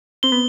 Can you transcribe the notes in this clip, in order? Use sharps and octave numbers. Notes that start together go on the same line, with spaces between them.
C4 G7
B3